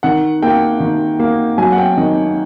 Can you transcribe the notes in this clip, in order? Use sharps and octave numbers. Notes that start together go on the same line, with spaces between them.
D#3 F#5
A#3 G5
D#3
A#3
F#3 G#5
F#5
G5
D#3 D#5